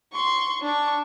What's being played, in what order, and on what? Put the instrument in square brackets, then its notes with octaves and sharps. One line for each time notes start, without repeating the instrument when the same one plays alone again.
[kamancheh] C6 C#6
D4 C#6